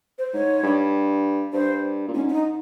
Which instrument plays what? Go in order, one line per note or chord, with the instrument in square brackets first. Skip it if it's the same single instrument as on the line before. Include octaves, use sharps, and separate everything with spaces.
[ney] C5
[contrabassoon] G#2 [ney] C#5
[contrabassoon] G2
[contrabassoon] G2 [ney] C5
[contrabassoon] A#2
[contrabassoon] G#2 [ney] C#4
[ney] C#4
D#4